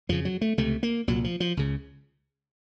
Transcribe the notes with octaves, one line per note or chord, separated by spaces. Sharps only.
F2 C#3 F3
F#3
A3
C#2 C3 A3
A#3
C2 A#2 F#3
F3
F3
C#2 C#3